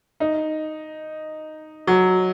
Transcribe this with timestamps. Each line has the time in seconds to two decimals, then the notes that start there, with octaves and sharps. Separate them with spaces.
0.20 D#4
1.87 F#3